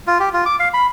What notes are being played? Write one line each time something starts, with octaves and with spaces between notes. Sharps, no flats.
F4
G4
F4
D6
F5
B5